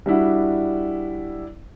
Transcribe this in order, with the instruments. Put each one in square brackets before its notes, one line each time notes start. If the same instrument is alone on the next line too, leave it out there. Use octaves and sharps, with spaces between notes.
[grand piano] G3 D4 E4 F#4